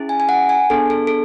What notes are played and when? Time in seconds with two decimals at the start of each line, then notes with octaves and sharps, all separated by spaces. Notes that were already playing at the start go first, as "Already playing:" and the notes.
Already playing: C#4 E4 G#4
0.09 G#5
0.20 G#5
0.29 F#5
0.49 G#5
0.70 B3 D4 G#4 A4
0.90 A4
1.07 A4